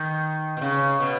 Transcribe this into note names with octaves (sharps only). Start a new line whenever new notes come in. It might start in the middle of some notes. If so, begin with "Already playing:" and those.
Already playing: D#3
B2
C#3
B2